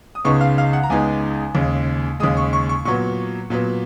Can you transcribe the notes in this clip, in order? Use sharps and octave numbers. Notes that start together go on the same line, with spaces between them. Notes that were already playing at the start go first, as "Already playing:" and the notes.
D#6
C#2 C#3 G#3 B3 D#4 C#6
F5
F5
F#5
A#5
C#2 C#3 G#3 B3 D#4 G#5
D#2 C#3 G#3
D#2 C#3 G#3 D#6
C#6
C#6
C#6
A#2 F#3 B3 C#6
A#2 F#3 B3